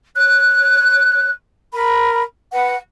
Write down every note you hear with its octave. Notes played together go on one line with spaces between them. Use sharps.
C#5 F#6
A#4 B5
B4 F#5